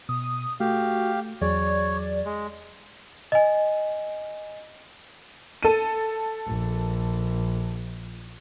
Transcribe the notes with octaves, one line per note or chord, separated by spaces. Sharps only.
B2 D#6
A3 F#4 G4 F5
E2 F#3 G#4 C#5 D5
G#3
D#5 G#5
A4 D#7
A#1